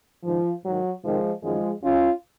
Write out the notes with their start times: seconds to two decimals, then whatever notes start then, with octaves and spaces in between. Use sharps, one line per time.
0.23 G#2 D#3 F3
0.63 G#2 D#3 F#3
1.03 F2 C3 D#3 F3 G#3
1.42 F#2 D#3 F3 G#3
1.81 F#2 C#3 C#4 F4